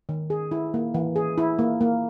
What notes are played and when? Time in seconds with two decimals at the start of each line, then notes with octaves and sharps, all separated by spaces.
0.09 D#3
0.30 G#4
0.51 E4
0.74 A#3
0.94 E3
1.16 G#4
1.38 E4
1.59 A#3
1.81 A#3